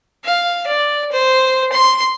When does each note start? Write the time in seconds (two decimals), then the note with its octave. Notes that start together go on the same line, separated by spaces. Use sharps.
0.24 F5
0.67 D5
1.12 C5
1.72 C6